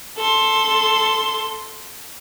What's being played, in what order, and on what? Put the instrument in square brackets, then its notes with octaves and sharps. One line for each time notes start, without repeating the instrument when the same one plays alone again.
[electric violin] A4 C6